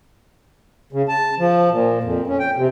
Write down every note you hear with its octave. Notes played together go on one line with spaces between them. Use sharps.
C#3
A5
F3
A#2
F2
C#4
G5
C3